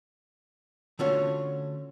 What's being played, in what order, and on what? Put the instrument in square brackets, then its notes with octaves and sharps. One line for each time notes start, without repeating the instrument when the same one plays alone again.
[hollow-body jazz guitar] D3 A3 C#4 F4 F#4 C#5